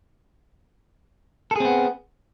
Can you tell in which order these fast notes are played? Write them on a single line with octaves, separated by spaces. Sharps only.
A4 G#4 C4 B3